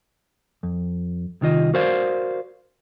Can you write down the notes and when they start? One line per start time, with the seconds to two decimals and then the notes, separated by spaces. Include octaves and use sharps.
0.63 F2
1.41 C2 D#3 F4 D#5
1.74 F#4 A#4 C5 D5 F5